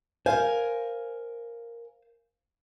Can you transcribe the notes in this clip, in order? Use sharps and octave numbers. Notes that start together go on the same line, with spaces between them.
A#4 C5 F5 G#5